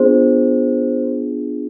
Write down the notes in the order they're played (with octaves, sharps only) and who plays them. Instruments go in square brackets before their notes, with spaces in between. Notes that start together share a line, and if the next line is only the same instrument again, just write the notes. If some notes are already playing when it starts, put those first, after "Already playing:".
Already playing: [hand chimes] B3 D4 F4 G#4 C5